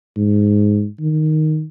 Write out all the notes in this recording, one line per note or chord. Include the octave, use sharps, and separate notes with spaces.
G#2
D#3